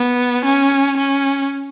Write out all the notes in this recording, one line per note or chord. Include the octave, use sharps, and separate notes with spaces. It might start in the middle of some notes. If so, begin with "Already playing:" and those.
Already playing: B3
C#4
C#4